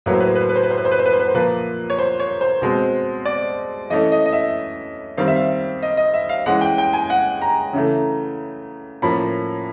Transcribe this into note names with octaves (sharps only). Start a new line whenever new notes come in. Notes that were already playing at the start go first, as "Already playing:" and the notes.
A2 F#3 A#3 B4
C5
B4
C5
B4
C5
B4
C5
B4
C5
B4
C5
B4
C5
B4
C5
B4
C5
A#2 F3 A#3 B4
C#5
C5
C#5
C5
B2 G#3 C4
D5
E3 A3 C#4 D#5
D#5
D#5
E5
D#3 G3 C4 F5
E5
F5
D#5
D#5
E5
F5
E3 G#3 C#4 F#5
G5
G5
G#5
F#5
A#5
C#3 E3 A3
A2 F3 A#3 C#4 B5